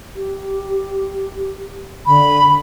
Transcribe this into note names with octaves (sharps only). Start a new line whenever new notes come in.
G4
D3 B5